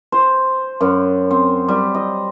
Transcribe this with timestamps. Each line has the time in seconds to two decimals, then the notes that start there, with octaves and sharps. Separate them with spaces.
0.12 C5
0.81 F#2
1.31 C4
1.68 G3
1.95 D#5